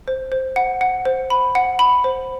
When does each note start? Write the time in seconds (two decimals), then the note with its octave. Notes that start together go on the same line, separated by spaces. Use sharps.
0.08 C5
0.32 C5
0.56 F#5
0.81 F#5
1.05 C5
1.30 B5
1.55 F#5
1.79 B5
2.04 C5